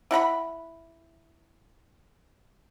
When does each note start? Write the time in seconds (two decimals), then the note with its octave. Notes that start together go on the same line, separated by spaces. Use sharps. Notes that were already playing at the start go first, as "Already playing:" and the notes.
0.11 E4 F#5 A#5 B5